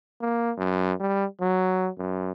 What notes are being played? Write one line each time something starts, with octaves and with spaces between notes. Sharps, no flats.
A#3
F#2
G3
F#3
F#2